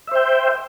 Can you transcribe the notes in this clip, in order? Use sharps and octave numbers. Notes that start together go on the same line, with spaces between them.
C5 E5 G5